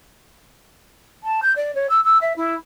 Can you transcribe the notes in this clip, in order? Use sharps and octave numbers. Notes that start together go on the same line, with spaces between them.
A5
G6
D5
C#5
E6
E6
E5
E4